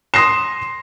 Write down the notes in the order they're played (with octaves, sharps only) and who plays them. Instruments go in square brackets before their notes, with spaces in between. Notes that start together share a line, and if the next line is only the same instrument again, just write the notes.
[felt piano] C6 D#6 A#6 C7 E7